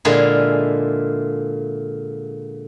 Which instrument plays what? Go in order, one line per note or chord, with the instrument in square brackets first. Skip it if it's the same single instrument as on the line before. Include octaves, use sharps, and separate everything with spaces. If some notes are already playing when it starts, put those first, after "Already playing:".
[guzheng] A#2 D3 G#3 E4 F4 G#4